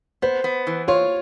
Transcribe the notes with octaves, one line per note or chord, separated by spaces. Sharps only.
B3 C5
B3
E3
F4 C#5